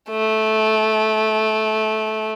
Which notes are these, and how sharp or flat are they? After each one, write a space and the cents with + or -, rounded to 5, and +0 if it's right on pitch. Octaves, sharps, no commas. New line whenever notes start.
A3 -15